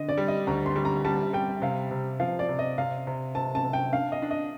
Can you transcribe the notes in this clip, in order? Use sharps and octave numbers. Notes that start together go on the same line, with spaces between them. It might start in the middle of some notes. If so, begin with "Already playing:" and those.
Already playing: D3 D#5
D5
G3
D#5
D2 A#5
C6
G3
A#5
G3 A5
G3 G5
C3 F5
C3
F3 F5
D5
C3
D#5
C3 F5
C3
C3 A5
A5
C3
G5
D4 F5
D#5
D4
D#5